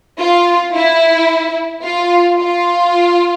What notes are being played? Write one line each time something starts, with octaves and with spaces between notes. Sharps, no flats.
F4
E4
F4
F4